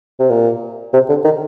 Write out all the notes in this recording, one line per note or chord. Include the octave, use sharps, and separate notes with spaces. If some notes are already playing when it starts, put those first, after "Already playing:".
C3
A#2
C3
D3
D#3